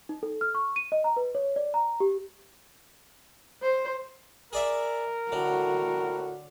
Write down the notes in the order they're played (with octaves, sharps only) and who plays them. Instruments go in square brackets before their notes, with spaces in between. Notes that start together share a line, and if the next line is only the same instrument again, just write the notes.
[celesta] D#4
A4
F6
C#6
D#7
D#5
A#5
B4
C#5
D5
A#5
G4
[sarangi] C5
[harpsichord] G#4 D5 E5 [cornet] A#4
[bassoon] A2 [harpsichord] D3 [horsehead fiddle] F#4